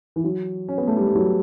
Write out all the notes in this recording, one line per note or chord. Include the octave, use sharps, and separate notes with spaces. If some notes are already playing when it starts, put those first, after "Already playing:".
E3
F#3
C#4
B3
A3
G3
G3
F#3